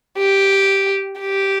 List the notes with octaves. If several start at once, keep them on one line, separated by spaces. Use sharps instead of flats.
G4
G4